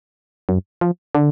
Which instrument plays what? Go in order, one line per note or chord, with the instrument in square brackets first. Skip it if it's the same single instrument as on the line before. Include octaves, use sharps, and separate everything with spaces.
[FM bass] F#2
F3
D3